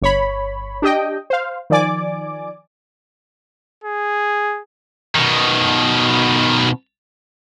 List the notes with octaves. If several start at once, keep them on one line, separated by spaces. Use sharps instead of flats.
G1 C#5 B5
D4 G4 D#5 G5
C5 F5
D#3 F3 D5 G#5 D6
G#4
B2 D#3